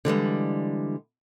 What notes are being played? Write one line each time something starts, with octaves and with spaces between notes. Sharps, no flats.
D3 E3 G3 G#3